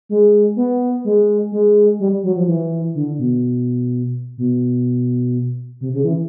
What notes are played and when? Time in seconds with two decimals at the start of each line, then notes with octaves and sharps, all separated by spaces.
0.09 G#3
0.56 B3
1.05 G#3
1.52 G#3
2.00 G3
2.23 F#3
2.36 F3
2.48 E3
2.95 D3
3.19 B2
4.38 B2
5.81 C3
5.94 C#3
6.04 E3